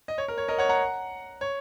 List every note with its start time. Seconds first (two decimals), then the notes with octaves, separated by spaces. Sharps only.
0.08 D#5
0.18 C#5
0.28 A#4
0.38 C#5
0.48 A#4 D#5
0.58 C#5 F#5
0.69 F#5 A#5
1.41 C#5